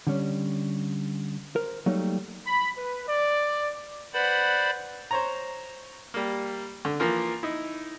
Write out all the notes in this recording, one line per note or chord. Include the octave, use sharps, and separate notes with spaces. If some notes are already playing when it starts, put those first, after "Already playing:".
D3 G3 C#4
A#4 C5
F#3 G3 A3 A#3 D#4
B5
B4
D5
B4 C5 D5 F#5 B5
C5 C#5 A#5
G3 A#3
D3
E3 F3 A#3 F4 A#4
D#4 E4